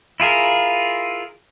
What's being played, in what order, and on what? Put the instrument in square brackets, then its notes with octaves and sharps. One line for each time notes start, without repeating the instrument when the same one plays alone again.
[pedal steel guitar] E4 F4 G#4 A#4